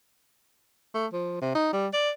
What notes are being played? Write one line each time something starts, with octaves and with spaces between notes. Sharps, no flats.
A3
F3
C3
D#4
G3
D5